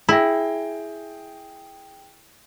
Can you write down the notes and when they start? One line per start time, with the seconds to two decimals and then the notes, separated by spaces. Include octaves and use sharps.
0.09 E4 G#4 G5 A#6